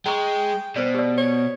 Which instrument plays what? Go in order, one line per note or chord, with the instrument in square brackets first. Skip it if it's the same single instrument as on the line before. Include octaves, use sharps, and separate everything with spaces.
[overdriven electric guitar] G#3 [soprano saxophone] G5 [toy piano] A#5 C#6
[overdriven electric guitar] B2 [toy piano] C5 D5
[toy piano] G4 D5
[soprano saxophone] C#5